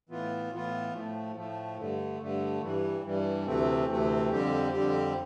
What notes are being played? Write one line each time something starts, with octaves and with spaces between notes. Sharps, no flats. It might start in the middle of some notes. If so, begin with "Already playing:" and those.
A2 E3 B3 F4
A2 E3 B3 F4
A2 F3 A3
A2 F3 A3
G2 D3 A3
G2 D3 A3
G2 E3 G3
G2 E3 G3
D2 C3 E3 A3 C4
D2 C3 E3 A3 C4
F2 D3 G3 C4 G4
F2 D3 G3 C4 G4